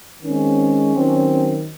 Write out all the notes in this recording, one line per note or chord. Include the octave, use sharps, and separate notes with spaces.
D#3 G#3 C4 C#4
D#3 F#3 C4